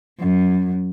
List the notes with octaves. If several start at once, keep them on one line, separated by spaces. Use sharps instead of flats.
F#2